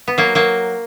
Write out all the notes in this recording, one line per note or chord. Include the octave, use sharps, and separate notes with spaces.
B3
F#3 A#3
F#3 A#3